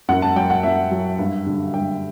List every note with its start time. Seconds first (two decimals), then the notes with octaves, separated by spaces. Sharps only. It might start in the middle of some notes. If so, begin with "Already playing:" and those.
0.09 F#2 F#5
0.22 A5
0.36 F#3 G5
0.50 F#5
0.63 F#2 E5
0.91 F#3
1.19 G2
1.47 D3 F#3
1.74 G2 G5